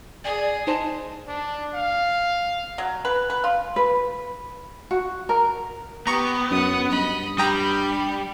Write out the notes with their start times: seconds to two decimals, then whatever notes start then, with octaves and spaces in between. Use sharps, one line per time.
0.25 G#4 D5
0.67 D#4 C5 A5
1.28 D4
1.74 F5
2.78 F#3
3.05 B4
3.30 B4
3.44 F4
3.76 B4
4.91 F#4
5.29 A#4
6.07 B3 G4 A#5 C#6
6.51 F#2 F#5 D#6
6.90 G2 D#5 B5
7.38 G3 G4 G5 A#5 B5 D#6